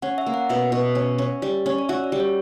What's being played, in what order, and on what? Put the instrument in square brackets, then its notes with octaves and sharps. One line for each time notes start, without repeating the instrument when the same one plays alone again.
[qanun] C#4 [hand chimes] F#5
[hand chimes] E5
[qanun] A#3
[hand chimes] F#5
[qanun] B2 [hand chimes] E5
[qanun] B2
C#4
C#4
G3
C#4
[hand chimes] D5
[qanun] F#4 [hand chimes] E5
[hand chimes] D5
[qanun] G3
[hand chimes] C#5